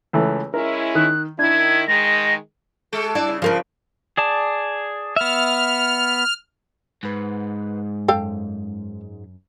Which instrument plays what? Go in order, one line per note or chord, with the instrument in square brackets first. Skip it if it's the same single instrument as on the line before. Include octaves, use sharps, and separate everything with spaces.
[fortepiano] C#2 E3 A3
[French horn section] G#3 C#4 E4 [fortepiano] A#4
[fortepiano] D#3 [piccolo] F#6
[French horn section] D#3 E4 [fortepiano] D4 [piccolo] G#6
[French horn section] D#3 G#3 [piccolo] A#6
[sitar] G#3 G4 A4
[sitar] D4 D5 [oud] E4
[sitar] C#3
[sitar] C#3 [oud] F3 A#4 B4
[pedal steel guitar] G#4 D5 A5
[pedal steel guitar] B3 E5 [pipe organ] F6
[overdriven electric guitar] G#2 [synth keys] B4 F#5
[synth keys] F#2 [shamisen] A4 F5 G5